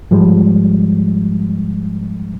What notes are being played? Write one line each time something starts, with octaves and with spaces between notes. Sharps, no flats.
G#2 F3 G3 G#3